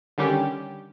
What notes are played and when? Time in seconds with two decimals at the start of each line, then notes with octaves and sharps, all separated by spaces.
0.18 D3 D#3 G3 C#4 G4